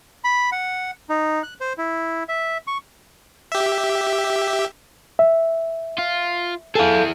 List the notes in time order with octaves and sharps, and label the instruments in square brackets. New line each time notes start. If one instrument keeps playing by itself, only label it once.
[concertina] B5
F#5
D#4
F#6
C5
E4
E5
C#6
[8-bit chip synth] G4 E5
[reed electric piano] E5
[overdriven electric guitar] F4
[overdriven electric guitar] E4 G#4 [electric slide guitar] A4 F5